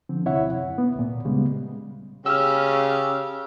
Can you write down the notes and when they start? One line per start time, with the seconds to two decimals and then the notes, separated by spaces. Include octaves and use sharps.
0.09 D3 F3 C4
0.26 D#2 C3 E4 C#5 E5 F#5
0.52 F#2
0.78 B3
0.95 D2 A#2
1.25 C#3 G3 G#3 B3
2.26 C#3 C#4 G4 E6 F6